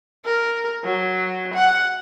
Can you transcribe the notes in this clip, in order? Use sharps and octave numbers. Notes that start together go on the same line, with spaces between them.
A#4
F#3
F#5